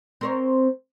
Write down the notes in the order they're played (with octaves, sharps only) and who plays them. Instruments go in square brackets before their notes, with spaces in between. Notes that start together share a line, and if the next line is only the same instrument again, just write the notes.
[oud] C4 A#4 C#5